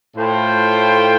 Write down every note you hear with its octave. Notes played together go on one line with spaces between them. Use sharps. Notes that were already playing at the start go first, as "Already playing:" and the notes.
A2 F4 C5 G5